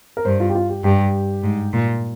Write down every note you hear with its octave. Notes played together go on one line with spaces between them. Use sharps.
A#4
G2 C5
F4
G4
F4
G4
G2 G4
G#2
A#2